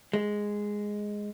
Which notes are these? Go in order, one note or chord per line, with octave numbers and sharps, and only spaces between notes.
G#3